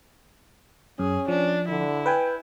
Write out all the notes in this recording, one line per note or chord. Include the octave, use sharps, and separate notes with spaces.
F#2 C#4 G#4
F3 D4
D3 E4
B4 G5 G#5